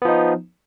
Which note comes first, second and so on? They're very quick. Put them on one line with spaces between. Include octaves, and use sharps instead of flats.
B3 F3 D#4